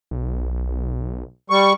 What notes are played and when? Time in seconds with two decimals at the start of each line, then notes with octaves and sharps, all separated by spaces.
0.11 B1
1.50 G3 C#6